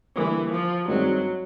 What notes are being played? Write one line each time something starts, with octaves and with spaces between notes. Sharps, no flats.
D3 E3 G3 A#3
F3
G2 D#3 F#3 G#3 C4